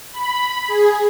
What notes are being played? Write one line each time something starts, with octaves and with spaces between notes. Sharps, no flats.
B5
G#4